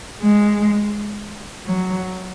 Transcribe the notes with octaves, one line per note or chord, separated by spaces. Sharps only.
G#3
F#3